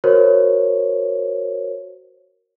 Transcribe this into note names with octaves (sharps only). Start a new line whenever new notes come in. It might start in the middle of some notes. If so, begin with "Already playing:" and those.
F#4 A#4 C5 C#5